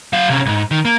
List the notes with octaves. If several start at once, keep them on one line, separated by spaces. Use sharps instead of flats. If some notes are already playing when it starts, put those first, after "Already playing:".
F#3 F5
C3 C#4
B1 G#2
D#3
A#3